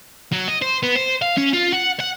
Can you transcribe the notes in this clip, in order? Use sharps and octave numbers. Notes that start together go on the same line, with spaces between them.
F#3
D#5
C5
B3
C5
F5
C#4
F4
F#5
F#5